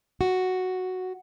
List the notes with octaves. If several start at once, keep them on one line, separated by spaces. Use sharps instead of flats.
F#4